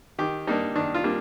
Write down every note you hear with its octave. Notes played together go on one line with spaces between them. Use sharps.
D#3 G4
G3 A#3 D4 D#4
D#3 D4
F4
G3 A#3 D4